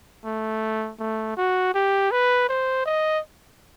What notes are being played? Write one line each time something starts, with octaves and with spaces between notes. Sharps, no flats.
A3
A3
F#4
G4
B4
C5
D#5